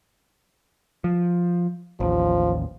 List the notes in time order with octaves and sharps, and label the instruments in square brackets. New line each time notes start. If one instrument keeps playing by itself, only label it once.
[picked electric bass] F3
[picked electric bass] A1 D#2 [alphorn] F3